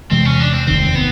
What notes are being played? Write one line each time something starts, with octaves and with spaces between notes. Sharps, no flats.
E2 C3 E3 G#3 C4
C#4
D4
C4
F1 D#2 D#3 C4
B3